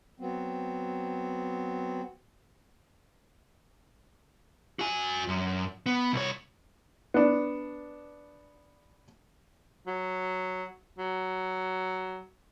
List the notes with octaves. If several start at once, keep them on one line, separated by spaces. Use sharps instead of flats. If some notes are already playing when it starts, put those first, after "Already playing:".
F#3 B3 C4
F#4 G#5
F#2
B3
C2 C#5
B3 D4
F#3
F#3